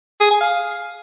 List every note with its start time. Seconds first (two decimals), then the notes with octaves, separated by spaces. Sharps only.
0.20 G#4
0.31 G#5
0.41 F5